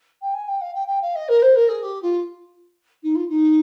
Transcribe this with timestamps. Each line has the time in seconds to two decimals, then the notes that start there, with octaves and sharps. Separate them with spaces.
0.22 G5
0.34 G#5
0.49 G5
0.61 F5
0.75 G5
0.88 G5
1.02 F5
1.16 D#5
1.29 A#4
1.42 C5
1.56 A#4
1.69 G#4
1.83 G4
2.02 F4
3.03 D#4
3.16 F4
3.29 D#4